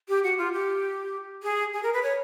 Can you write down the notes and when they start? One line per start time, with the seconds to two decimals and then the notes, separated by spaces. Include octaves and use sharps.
0.09 G4
0.23 F#4
0.38 F4
0.53 G4
1.43 G#4
1.74 G#4
1.83 A#4
1.94 B4
2.02 C#5